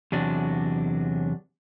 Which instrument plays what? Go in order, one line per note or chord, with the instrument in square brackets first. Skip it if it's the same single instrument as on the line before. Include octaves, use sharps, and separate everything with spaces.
[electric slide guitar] E2 C3 F#3 D4